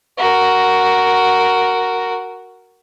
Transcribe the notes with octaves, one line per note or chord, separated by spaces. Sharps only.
F#4 A#4